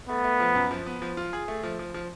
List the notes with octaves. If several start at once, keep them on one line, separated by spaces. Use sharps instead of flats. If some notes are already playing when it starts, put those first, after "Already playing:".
A3 B3
A3
F3
F#2
F3
B3
F3
F4
G#4
A3
F3
F3
F3